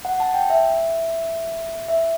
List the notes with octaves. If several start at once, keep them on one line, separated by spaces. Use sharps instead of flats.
F#5
A5
G5
E5
E5